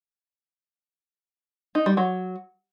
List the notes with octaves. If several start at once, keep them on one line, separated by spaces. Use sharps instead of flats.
D#4
G3
F#3